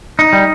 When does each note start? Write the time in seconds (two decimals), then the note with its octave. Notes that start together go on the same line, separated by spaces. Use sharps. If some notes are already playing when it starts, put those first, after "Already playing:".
0.19 D#4
0.33 G3